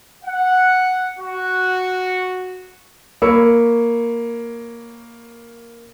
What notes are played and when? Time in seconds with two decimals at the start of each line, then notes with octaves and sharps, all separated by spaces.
0.24 F#5
1.18 F#4
3.22 A#3 C#5 B5 E6 C#7